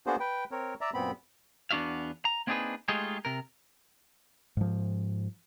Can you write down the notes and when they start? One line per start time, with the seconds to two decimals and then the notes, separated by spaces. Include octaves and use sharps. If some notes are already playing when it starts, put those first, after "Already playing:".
0.07 A#3 B3 D4 F#4 G#4 C5
0.20 B4 G5
0.51 C4 A#4 C#5
0.81 D5 E5 A#5
0.94 F#2 A#2 B3 C4 B5
1.71 E2 B3 D4 F#4 E5 F5
2.25 A#5
2.47 A#3 C4 D4 D#4 G#4 B4
2.88 G#3 A3 D#4 F4 G4 G#4
3.25 C3 A#4
4.57 G#2 F3